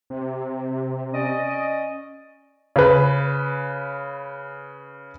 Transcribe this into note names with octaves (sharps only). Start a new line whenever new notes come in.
C3
C#4 D5 D#5
C#3 B4